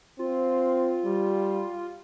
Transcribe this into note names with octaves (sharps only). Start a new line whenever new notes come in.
C4 F4
G3